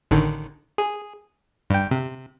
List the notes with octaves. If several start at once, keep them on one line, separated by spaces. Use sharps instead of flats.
A1 D3 D#3
G#4
G2 G5
C3